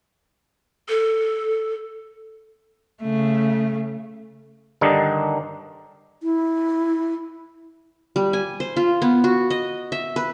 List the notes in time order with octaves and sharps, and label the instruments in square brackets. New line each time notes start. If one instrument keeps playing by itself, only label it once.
[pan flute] A4
[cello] C#3 A3
[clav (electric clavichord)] G2 D3 D#3 D4 D#4
[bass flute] E4
[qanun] G3
G#5
C5
F4
B3
F#4
D#5
E5
B4